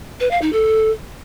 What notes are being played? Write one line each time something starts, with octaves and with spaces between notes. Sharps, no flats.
B4
F5
D#4
A4